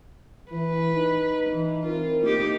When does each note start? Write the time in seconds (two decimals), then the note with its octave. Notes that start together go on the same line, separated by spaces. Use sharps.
0.51 E3 B4
0.95 D#4
1.50 E3
1.86 C4 E4 F4 A#4
2.22 A#3 D#4 G4